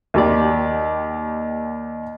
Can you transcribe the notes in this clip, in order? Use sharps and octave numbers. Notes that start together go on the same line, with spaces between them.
D#2 G4 D5